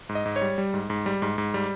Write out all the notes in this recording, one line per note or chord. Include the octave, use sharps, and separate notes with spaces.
G#2
D#5
G#2
C#5
G3
G3
G#2
G#2
G3
G#2
G#2
G3